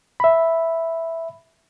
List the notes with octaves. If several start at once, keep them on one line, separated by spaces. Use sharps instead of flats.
E5 B5